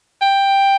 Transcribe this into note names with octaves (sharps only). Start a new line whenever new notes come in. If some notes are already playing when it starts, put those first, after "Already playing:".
G5